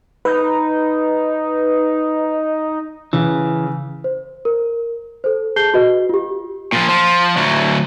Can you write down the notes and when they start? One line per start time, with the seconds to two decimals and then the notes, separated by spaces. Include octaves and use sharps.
0.25 D#4 B4
3.13 C#3 E3
4.04 C5
4.45 A#4
5.24 A4 C5
5.56 G#4 A5 G6 C7 G7
5.74 F#4 B4 D#5
6.09 F4 G4
6.72 A#2 F3
6.89 F3
7.37 D2 F#3